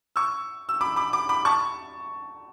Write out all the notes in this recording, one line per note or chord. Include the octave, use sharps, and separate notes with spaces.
C#6 E6
E6
B5 D6
B5 D6
B5 D6
B5 D6
A5 C#6